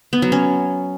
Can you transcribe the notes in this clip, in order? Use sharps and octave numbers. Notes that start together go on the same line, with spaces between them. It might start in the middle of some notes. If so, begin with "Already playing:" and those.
B3
F#3
C#4